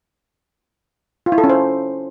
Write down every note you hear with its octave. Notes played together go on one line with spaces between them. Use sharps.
F4
E4
A4
C#4
C5